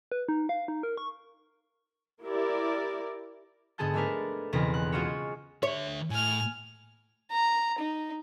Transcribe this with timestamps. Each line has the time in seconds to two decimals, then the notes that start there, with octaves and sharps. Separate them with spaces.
0.12 B4
0.29 D#4
0.49 F5
0.68 D#4
0.83 A#4
0.97 C#6
2.23 E4 G4 A#4 D5
3.78 G#2 D3 B3 G#4 A5 G6
3.94 G#3 A3 D4 A#4 B4
4.53 B1 E2 C#3 C4 B4 A#6
4.74 F#6
4.92 G#3 C#4 F4 F#4 C5 C#5
5.63 D3 C#5 E5
6.10 A2 G#5 F6
7.31 A#5
7.78 D#4